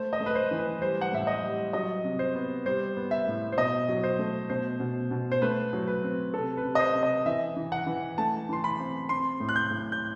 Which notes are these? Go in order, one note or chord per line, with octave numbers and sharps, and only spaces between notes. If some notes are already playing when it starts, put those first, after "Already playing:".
Already playing: A3 C5
D#5
A3
B4
C5
E3
B4
G3 C5
F#5
A2 E5
D#5
G3
F#3 D#5
C3
C5
B3
G3 C5
B3
E5
A2
C5
B2 D#5
F#3
C5
A3
B2 C5
B2
B2
C5
A3 B4
F#3
B4
C4
C3 A4
B4
C3
D#5
C5
C3
D#5
E3 E5
E3
F#5
E3
A3 A5
E3 C6
B5
C4
C4 C6
A2
F#6
G6
A2
G6